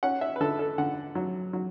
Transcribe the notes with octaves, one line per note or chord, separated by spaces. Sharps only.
C#4 F#5
E5
B4
D3 A4
A4
D3 F#5
F#3
F#3